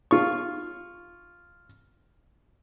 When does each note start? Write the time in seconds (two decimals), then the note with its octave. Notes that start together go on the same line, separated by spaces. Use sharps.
0.11 F4 C#6